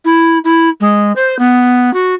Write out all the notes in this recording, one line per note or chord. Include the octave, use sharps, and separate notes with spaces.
E4
E4
G#3
C5
B3
F#4